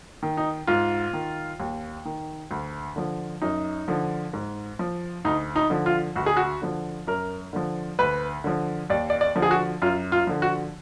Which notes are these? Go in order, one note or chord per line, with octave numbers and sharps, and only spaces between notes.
D#3
D#4
G#2 F4
D#3
D#2
D#3
D2
D3 F3
F#2 D#4
D3 F3
G#2
F3
D2 D#4
D#4
D3 F3
F4
D2 F#4
G#4
F#4
D3 F3
F#2 A#4
D3 F3
D2 B4
D3 F3
D#2 D5
D5
D5
D3 F3
G#4
F#4
F#2 F4
F4
D3 F3
F#4